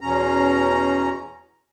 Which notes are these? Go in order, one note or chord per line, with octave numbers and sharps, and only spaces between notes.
E2 B2 C#4 A#5